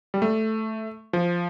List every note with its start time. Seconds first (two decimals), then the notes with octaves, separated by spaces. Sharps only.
0.14 G3
0.22 A3
1.13 F3